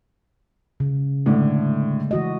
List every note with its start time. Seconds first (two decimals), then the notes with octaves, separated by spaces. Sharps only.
0.80 C#3
1.26 A2 D3 G#3 A3
2.11 E3 F#4 D#5